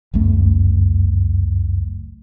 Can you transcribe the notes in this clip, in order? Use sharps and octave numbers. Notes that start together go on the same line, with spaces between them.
G1 C#2 F#2 A3